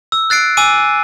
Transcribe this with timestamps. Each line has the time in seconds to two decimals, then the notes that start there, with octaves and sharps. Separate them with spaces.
0.12 E6
0.30 F#6 A6 C7 D7
0.57 G#5 D6 E6 D#7